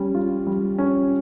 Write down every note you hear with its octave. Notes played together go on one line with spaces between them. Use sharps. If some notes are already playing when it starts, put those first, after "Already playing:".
Already playing: G3 C#4
F4
G3
C#4